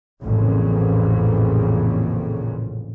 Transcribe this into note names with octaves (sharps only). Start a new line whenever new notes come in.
A1 F2 A#2 C#3